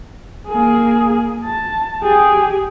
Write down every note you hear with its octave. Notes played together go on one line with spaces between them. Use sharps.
A#3 G#4
A5
G4 G#4